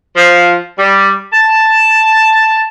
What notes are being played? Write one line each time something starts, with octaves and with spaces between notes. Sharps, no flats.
F3
G3
A5